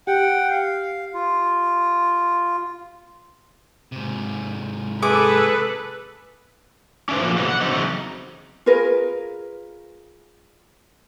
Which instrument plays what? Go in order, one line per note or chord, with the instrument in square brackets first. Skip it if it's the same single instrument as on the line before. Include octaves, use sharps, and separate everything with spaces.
[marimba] G4 [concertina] F#5 G5
[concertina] F5
F4
[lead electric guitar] G#2 C3
[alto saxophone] G#4 [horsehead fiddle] A4 B4 [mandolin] D6
[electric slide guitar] C#4 D4 E4 G4 B4 C5
F3 F#3 A#3
A2 C3 E3 G#3 F#4
F#5
E2 C#3 F#3 C4 C#4 D#4
[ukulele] F4 G#4 A#4 B4